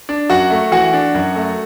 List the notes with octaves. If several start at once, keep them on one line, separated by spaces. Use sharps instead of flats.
D4
F#2 F#4 F#5
A3
E3 F#4 F#5
D4
F#2
A3